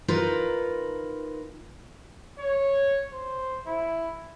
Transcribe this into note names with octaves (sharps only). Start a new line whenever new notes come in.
D#4 F4 A#4 B4
C#5
C5
E4